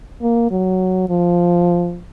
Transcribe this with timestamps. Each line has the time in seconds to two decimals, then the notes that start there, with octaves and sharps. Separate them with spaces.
0.22 A#3
0.51 F#3
1.10 F3